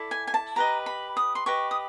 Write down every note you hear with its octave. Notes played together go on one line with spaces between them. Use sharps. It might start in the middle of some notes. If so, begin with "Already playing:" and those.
Already playing: E4 A4 D5
G#5
G#5
A5
G4 B4 D#5 A#5
B5
D#6
C6
G4 B4 D#5 C#6
D#6